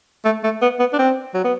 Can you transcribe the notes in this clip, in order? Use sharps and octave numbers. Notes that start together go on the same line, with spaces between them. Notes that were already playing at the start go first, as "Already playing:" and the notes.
A3
A3
B3
B3
D4
C4
F#3
B3